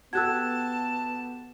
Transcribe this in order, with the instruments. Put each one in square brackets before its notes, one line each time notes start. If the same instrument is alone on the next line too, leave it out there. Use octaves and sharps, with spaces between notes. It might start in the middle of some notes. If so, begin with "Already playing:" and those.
[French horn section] B3 [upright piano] F#4 G4 A4 [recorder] A5 [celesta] E6 F#6 G#6